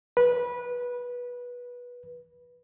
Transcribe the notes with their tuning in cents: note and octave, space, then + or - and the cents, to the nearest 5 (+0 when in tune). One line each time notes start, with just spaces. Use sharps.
B4 -15